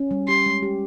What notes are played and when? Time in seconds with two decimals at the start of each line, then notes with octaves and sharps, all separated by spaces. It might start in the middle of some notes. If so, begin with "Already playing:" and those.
Already playing: C#4
0.11 G3
0.28 G4 C6
0.46 G#3
0.63 G4